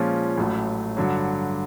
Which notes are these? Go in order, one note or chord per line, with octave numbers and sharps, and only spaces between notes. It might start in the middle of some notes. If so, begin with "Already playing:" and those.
Already playing: A#2 F3 G#3 C#4
A1 A2 F#3 A3
G2 D3 F#3